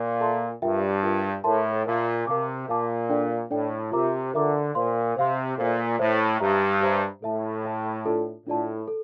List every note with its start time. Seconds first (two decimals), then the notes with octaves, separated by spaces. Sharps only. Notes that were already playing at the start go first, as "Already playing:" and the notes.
Already playing: A#2
0.21 A4 E5 A5 C6
0.62 G2 F4 A#4 E5 G5
1.03 F4 A#4 E5 G5
1.44 A2 A#4 E5 A5 C6
1.86 A#2 A#4 E5 A5 C6
2.27 C3 A#4 F5 A5 D6
2.68 A#2 A#4 F5 A5 D6
3.10 D4 A4 D5 G5
3.51 A2 D4 A4 D5 G5
3.92 C3 F4 A#4 E5 A#5 D6
4.33 D3 F4 A#4 E5 A#5 D6
4.75 A#2 C5 F5 C6
5.16 C3 C5 F5 C6
5.57 A#2 A4 C5 E5
5.99 A2 A4 C5 E5
6.40 G2 G4 C5 E5 A#5
6.81 G4 C5 E5 A#5
7.22 A2 A4 E5 A5
7.64 A4 E5 A5
8.05 D4 F4 A4 D5 A5
8.47 A2 D4 F4 A4 D5 A5
8.88 A4